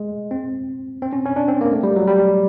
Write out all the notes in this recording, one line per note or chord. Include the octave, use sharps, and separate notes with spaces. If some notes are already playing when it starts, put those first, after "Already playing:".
Already playing: G#3
C4
C4
C#4
C#4
D4
C4
A#3
A3
G3
F#3
G3